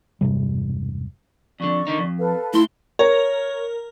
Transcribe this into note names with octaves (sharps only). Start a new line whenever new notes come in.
E1 G2 C3 G3
F2 D3 D5 C#6
D3 D#3 D#4
F2
A4 B4 F5
A3 E4 C6
A#4 C#5